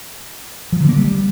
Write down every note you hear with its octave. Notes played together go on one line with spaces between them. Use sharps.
F3
D3
A#3
G3